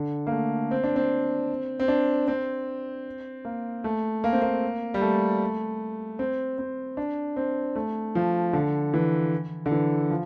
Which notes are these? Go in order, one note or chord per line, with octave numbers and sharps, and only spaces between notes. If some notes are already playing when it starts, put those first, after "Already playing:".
Already playing: D3
A#3
A3
C4
D4
C4
C4
D4
C4
A#3
A3
A#3
C4
A#3
G3
A3
C4
C4
D4
C4
A3
F3
D3
E3
D3
E3
F3